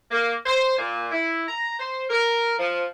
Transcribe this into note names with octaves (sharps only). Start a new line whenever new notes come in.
A#3
C5
A#2
E4
A#5
C5
A#4
F3